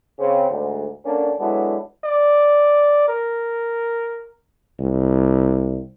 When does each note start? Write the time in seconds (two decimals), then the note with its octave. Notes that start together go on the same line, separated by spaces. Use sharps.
0.19 C#3 C4
0.50 D2 G#2
1.05 D3 A#3 C#4 D4
1.40 D3 F#3 G#3 B3 D4 E4
2.04 D5
3.08 A#4
4.79 C2